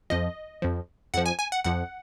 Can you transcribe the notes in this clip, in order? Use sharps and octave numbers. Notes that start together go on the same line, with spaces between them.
F2 F3 D#5
F2 F3
F2 F3 F#5
G#5
G#5
F#5
F2 F3 F#5